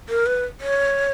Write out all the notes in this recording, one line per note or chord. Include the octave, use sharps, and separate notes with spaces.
A#4
B4
C#5